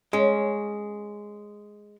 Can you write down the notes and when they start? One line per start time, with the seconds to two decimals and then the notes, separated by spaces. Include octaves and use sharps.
0.13 G#3 C#4